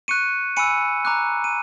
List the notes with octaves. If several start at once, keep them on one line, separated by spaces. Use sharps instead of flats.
C#6 F#6 C#7 D#7
G#5 B5 E6 C#7 D#7
A#5 D6 F#6
D#7